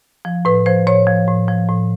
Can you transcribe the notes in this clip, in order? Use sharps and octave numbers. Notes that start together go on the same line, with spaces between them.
F3
A2 B4
F3 C5
A2 C#5
F3
A2
F3
A2